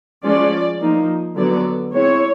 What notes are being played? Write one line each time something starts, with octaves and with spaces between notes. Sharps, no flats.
F3 G#3 C#4 F4 D5
F3 A#3 D#4
D3 F#3 B3 D5
G#3 C4 E4 C#5